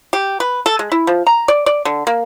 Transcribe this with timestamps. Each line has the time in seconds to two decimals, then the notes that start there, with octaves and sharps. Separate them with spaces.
0.13 G4
0.40 B4
0.66 A4
0.79 G#3
0.92 E4
1.07 F3
1.27 A#5
1.48 D5
1.66 D5
1.85 D3
2.07 A#3